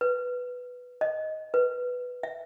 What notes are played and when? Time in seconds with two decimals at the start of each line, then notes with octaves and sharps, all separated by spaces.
0.01 B4
1.01 D#5
1.54 B4
2.23 E5